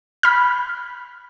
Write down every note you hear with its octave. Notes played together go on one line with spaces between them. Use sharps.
B5 F6